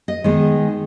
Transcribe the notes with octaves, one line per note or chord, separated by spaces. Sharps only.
D#5
D#3 G#3 B3